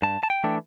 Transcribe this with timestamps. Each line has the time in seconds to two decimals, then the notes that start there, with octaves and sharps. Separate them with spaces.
0.02 G2 A5
0.23 A5
0.30 G5
0.44 E3 A3 D4